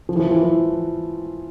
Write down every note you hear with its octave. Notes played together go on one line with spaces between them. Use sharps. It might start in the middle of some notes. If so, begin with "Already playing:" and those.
F3
E3
F3
E3
E3